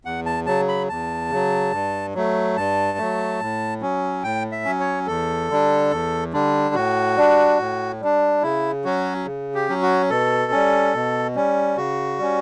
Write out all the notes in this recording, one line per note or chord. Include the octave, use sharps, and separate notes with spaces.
E2 F#5
A5
C#3 F#3 A5
B5
E2 A5
C#3 F#3
G2
F#3 A3
G2 A5
F#3 A3
A2
F#3 C#4
A2 G5
E5
F#3 C#4
C#5
E2 A4
D3 G3 D4
E2
D3 G3 D4
A2 F#4
G3 D4
A2
G3 D4
C#3 E4
F#3 C#4 F#4
C#3
G4
F#3 C#4
F#4
B2 A4
G3 C#4
B2
G3 C#4
C#3 F#4
G3 C#4